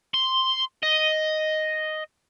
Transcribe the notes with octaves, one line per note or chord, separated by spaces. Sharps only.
C6
D#5